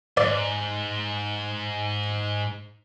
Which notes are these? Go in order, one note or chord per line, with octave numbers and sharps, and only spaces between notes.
G#2 D5